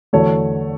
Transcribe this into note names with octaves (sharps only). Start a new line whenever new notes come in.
E2 D3 F#3 A3 A4 C#5